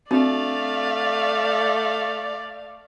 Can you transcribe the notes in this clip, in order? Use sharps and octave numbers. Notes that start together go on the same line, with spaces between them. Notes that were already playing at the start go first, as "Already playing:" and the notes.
A3 C4 D4 F#4 D5 F5